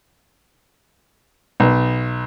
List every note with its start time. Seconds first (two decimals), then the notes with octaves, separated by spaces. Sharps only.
1.60 B1